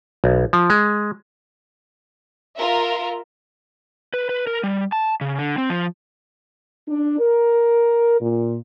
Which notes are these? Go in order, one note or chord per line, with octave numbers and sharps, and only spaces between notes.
B1
F3
G#3
F4 A#4 E5
B4
B4
A#4
G3
A5
C#3
D3
C4
F3
D4
A#4
A#2